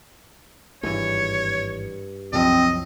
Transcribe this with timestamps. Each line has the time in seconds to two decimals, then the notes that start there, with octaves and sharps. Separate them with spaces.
0.83 G#1 G2 E3 C#5
2.33 C2 F#2 F3 C4 D#5